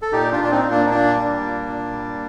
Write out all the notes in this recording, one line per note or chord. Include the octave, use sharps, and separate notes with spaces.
A4
A#2 D#4 G4
D4 F4
A#2
D4
C4 D#4
A#2
A#3 D4
D#4
A#2 A#3 D4
G3
A#2
A#2
G3